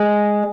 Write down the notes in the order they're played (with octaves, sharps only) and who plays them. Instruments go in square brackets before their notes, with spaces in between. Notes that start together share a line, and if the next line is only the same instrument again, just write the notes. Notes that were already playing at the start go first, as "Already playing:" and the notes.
Already playing: [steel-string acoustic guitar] G#3